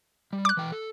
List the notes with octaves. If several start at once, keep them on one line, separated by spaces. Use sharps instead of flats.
G3
D6 F#6
E3 G5
A4